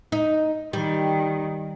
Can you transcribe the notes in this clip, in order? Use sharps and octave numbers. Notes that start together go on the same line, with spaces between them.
D#4
D#3 G3